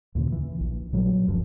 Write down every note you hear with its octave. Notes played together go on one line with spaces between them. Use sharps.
D#2 A#2 C#3
E3
A#1
A#2 F#3 G3
D1 F#2 F3